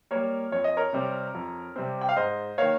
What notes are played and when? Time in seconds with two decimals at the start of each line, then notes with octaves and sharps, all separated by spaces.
0.11 G3 A#3 A#4 C#5
0.52 F2 C#5
0.64 D#5
0.77 A#4 C#5
0.93 C3 G3 C4
1.34 F2
1.76 C3 G3 C4
2.01 G5
2.09 F5
2.16 G#2 C5 D#5
2.58 D#3 A#3 C#5 F5